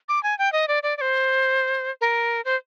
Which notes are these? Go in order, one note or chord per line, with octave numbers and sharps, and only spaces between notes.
D6
G#5
G5
D#5
D5
D5
D5
C5
A#4
C5